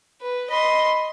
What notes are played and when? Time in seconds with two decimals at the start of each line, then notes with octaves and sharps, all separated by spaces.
0.21 B4
0.50 D#5 B5 C6